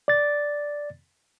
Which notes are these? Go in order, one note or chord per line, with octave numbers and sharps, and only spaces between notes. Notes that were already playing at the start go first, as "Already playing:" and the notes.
D5 A6